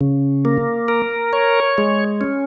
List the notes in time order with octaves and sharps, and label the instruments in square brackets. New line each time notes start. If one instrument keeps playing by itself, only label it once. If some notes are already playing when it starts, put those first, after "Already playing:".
[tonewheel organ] C#3
A#3
A#4
C#5
G#3
C#4